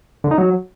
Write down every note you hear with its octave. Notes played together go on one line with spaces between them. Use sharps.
D3
D#4
F#3